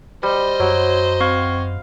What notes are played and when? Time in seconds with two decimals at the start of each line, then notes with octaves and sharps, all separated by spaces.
0.23 G3 C5 D#5
0.60 F#2 F#3 C#5
1.20 C4 F5 C#6 G#6